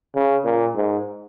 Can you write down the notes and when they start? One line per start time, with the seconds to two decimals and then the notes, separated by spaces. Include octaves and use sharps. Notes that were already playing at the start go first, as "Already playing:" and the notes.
0.15 C#3
0.45 A#2
0.76 G#2